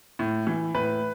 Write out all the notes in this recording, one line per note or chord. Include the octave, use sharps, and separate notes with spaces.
A2
E3
A2 B4